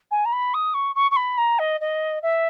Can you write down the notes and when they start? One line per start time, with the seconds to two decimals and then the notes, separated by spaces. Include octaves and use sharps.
0.11 G#5
0.25 A#5
0.32 B5
0.54 D#6
0.74 C#6
0.95 C#6
1.11 C#6
1.16 B5
1.38 A#5
1.59 D#5
1.80 D#5
2.22 E5